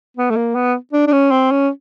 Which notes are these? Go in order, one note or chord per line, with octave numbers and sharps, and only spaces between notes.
B3
A3
A#3
B3
D4
D4
C#4
C4
C#4